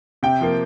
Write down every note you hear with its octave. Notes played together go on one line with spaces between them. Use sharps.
C3 G5
F3 A#3